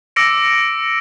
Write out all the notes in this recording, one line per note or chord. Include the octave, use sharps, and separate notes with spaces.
D6 E6 A#6 C#7 D7